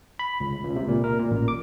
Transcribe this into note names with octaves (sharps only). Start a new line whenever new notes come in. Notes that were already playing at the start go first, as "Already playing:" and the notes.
B5
C#2
C#2
C3
A#2
A#4
A#2
A1
D6